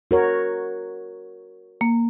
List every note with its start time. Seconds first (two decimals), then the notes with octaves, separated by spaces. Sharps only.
0.11 F#4 A#4 C#5
1.81 A#3